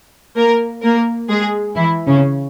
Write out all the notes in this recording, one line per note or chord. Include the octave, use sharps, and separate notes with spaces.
A#3 A#4
A#3 A#4
G#3 G#4
E3 E4
C#3 C#4